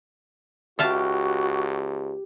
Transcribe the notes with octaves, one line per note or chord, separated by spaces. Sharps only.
C#2 F#4 G4 E5 F5 A5